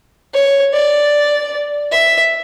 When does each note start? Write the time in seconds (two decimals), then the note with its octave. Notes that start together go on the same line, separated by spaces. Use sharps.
0.34 C#5
0.73 D5
1.92 E5